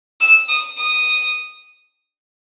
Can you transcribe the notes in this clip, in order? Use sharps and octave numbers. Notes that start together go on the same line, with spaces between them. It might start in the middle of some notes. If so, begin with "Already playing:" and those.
E6
D#6
D#6